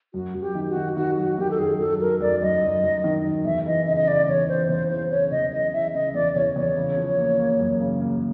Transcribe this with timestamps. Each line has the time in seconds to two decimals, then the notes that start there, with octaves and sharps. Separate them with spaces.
0.14 F#2 F#4
0.35 F#2
0.41 G4
0.55 D#3
0.70 F#4
0.76 D#3
0.96 D#3 F#4
1.18 F#3 F#4
1.38 D#3 G4
1.50 A4
1.59 F#2 G#4
1.80 F#3 A4
2.00 F#3 A#4
2.21 F#2 D5
2.42 F#2 D#5
2.62 F#2
2.83 F#2
3.04 D#3
3.25 F#2
3.45 E2 E5
3.66 E3 D#5
3.86 C#3 D#5
3.97 D#5
4.08 C#3 D5
4.28 E2 C#5
4.49 E3 C5
4.69 E2 C5
4.90 E3 C5
5.10 C#3 C#5
5.31 E2 D#5
5.53 E3 D#5
5.73 E3 E5
5.94 C#3 D#5
6.15 E2 D5
6.35 E2 C#5
6.56 E2 C#5
6.77 C#3
6.97 F3
7.18 A#3
7.39 A#3
7.60 F#2
7.80 C#3
8.01 A#3